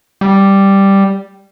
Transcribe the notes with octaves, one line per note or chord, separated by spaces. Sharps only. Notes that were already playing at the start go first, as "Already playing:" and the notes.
G3